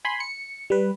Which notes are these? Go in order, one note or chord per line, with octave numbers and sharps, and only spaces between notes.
G#5 B5 C6
C#7
G3 B4